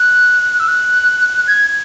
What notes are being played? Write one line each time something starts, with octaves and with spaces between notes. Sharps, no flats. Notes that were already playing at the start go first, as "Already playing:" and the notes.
Already playing: F#6
E6
F#6
G#6